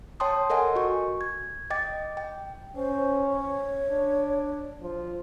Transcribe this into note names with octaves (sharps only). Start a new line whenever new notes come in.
C#5 G5 A5 C6 D#6
A4 A#4 D#5 F#5 G#5
F#4 C#6
G#6
D#5 G5 D6 A6
G5
C#4 C5
C#5
D4
F3